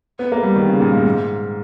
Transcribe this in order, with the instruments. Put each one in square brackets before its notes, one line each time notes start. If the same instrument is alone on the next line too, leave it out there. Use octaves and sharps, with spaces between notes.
[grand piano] B3
A#3
G3
D#3
C#3
A#2
G#2
G#2